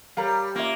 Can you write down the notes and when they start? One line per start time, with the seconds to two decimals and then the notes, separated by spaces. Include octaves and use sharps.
0.17 G3 A#4 C#5 F5 A#5
0.55 A#3 C#4 F4 C#5 E5